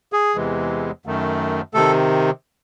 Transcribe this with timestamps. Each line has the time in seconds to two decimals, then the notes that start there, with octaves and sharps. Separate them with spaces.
0.13 G#4
0.35 E2 C3 E3 G#3
1.06 F#2 D#3 A3
1.74 C3 D#3 A3 A4